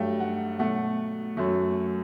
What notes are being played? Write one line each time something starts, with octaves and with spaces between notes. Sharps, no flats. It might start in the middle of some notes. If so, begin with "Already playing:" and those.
Already playing: G2 F#3 A3 G5
F#5
B2 F#3 A3 F#5
F#2 F#3 A3